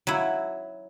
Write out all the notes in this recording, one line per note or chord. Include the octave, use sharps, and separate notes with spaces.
F#3 E4